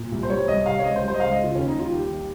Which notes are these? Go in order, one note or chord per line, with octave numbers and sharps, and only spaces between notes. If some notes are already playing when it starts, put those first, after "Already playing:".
Already playing: A#2
C2
C5
G3 C#5
C2 D#5
C3 F5
C#5
C#2 D#5
C5
G3
C5
D#5
C#2 F5
D#5
C#3
F4
D#2 C#4
D#4
G3
F4
D#2 G4
D#3